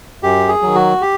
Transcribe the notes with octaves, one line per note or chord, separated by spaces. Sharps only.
F#2 G4
G#4
D#3 F#3
F#4
G4